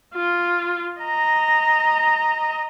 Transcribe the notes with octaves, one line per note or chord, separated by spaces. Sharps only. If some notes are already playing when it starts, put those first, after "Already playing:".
F4
D#5 A#5